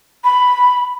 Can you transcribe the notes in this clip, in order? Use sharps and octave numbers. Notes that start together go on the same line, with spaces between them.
B5